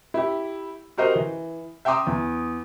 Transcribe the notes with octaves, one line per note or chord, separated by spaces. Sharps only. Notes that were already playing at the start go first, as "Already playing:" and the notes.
E4 G4
F#4 G4 A#4 C5 D#5
E3
E5 G5 A#5 C6 D6 D#6
E2